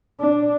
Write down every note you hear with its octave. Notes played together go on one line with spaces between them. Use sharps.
D4